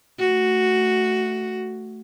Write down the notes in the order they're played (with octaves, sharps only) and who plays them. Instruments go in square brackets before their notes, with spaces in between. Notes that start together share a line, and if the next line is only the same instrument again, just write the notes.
[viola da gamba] A3 F#4